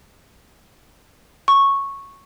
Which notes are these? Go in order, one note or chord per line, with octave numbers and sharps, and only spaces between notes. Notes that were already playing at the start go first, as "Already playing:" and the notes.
C#6